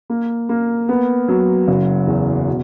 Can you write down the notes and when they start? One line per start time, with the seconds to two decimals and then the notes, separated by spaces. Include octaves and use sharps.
0.10 A#3
0.49 A#3
0.89 B3
1.29 F#3
1.68 F#1
2.07 E2
2.47 B2